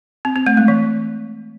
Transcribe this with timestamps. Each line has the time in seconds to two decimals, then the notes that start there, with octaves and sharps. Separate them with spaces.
0.25 C4
0.36 C4
0.47 A3
0.57 G#3
0.68 E3